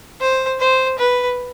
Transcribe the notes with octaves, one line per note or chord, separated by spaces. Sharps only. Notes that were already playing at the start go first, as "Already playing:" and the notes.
C5
C5
B4